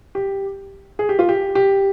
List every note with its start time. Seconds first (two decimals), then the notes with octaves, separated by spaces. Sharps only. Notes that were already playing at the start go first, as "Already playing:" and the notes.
0.15 G4
0.99 G#4
1.09 G4
1.19 F4
1.29 G4
1.55 G4